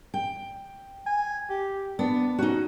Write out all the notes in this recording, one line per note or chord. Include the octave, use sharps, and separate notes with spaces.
G5
G#5
G4
B3 D4
C#4 D#4 F#4